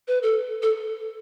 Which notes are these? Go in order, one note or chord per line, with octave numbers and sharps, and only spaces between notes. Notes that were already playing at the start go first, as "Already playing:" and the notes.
B4
A4
A4